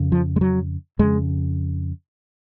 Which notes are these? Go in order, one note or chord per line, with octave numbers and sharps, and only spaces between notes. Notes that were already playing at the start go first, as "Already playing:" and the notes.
Already playing: F2 C#3
F3
G#3
F#3
F2 C#3 G#3